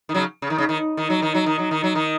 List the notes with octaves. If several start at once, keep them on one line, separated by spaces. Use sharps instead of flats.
D#3
C#3 F#3
C#3
D#3
C#3
D#3
D#3
F#3
D#3
F#3
D#3
F#3
D#3
F#3
D#3